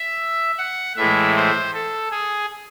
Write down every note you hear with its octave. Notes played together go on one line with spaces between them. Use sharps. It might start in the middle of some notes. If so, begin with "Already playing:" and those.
Already playing: E5
F#5
A2 E3 G#3 E5
C5
A4
G#4